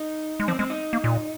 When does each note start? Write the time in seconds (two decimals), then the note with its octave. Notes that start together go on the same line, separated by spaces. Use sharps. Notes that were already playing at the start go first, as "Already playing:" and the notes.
Already playing: D#4
0.40 G#3
0.48 F3 C4
0.59 G#3 C4
0.70 D#4
0.93 A#3
1.04 A#2